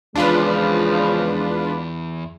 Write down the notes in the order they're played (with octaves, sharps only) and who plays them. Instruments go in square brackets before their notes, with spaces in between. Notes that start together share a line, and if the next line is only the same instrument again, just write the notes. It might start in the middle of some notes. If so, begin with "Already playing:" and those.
[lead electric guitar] E2 [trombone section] C#3 F3 [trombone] G#3 [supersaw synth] D4 F4 B4